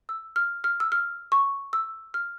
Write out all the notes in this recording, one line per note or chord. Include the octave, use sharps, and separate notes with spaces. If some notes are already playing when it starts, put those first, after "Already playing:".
E6
F6
F6
E6
F6
C#6
E6
F6